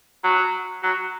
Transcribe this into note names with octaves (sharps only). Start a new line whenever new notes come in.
F#3
F#3